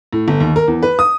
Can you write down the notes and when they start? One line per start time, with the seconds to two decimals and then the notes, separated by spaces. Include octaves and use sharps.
0.13 A2
0.28 G1
0.40 D#2
0.56 A#4
0.68 E2
0.83 B4
0.99 D#6